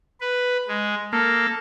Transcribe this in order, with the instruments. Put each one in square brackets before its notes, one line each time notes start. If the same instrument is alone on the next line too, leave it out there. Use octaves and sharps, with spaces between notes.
[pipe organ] B4
G#3
[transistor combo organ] A#3 [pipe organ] A4